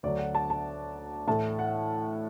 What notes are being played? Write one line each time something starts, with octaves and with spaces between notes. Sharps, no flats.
D2 D3 F#3 D4 D5
F#5
A5
A5
A2 E3 A3 A5
F#5